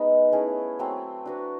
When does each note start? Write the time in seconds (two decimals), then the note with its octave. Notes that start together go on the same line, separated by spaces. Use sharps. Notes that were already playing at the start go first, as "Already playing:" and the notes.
Already playing: G#3 B3 D#4
0.32 A3 C#4 E4 G#4
0.79 F#3 A3 C4
1.26 D4 F#4 B4